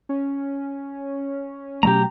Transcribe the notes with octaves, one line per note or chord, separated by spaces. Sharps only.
C#4
B2 F#3 A3 G4 A#5